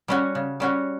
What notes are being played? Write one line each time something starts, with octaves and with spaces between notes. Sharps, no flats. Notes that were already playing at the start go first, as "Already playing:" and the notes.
G3 C#4 F#4
C#3
G3 C#4 F#4